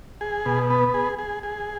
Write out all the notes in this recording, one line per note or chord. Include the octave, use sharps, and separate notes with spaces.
G#4
B2
B3
G#4
G#4
G#4